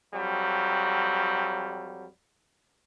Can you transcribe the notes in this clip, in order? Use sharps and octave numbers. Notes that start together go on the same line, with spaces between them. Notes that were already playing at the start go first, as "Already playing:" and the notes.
F2 F#3 G3